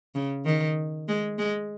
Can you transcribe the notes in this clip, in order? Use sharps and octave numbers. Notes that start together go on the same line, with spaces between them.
C#3
D#3
G#3
G#3